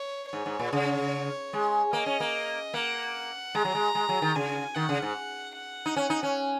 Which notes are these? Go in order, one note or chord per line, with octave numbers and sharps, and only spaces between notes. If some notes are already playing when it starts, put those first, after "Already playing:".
Already playing: C#5
G#2 C#5
G#2
A#2
C#3
G#3
A#3 D#5
C#4
A#3
A#3 F#5
G#3 A#5
F#3
G#3
G#3
F#3
D#3
C#3 G#5
D#3 F#5
C#3
G#2
F#5
D#4
C#4
D#4
C#4